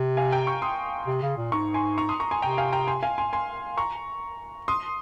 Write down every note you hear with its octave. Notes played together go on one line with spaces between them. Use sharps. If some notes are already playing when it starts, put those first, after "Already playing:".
Already playing: C3
F5 G#5
G5 A#5
A#5 C#6
C6 D#6
C3
C#3
A#2
G#2 A#5 C#6
G#5 C6
A#5 C#6
C6 D#6
A#5 C#6
G#5 C6
C3 G5 A#5
F5 G#5
G5 A#5
G#5 C6
F5 G#5
G#5 C6
G#5 C6
A#5 C#6
C6 D#6